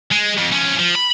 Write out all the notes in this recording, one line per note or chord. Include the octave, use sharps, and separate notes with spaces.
G#3
F2
F3 C#4
F3
B5